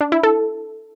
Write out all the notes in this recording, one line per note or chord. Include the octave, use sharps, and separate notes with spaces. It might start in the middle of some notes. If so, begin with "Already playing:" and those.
D4
E4
A4